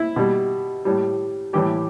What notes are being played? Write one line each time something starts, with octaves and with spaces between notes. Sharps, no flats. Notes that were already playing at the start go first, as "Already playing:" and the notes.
Already playing: E4
B2 G3
A2 G3
A2 E3 G3 G4